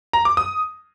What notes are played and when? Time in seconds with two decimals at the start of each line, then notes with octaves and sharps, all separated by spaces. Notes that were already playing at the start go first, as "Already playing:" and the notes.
0.13 A#5
0.25 D6
0.37 D#6